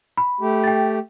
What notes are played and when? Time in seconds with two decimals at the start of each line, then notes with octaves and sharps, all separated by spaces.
0.17 B5
0.41 A3 G4
0.64 G5 A6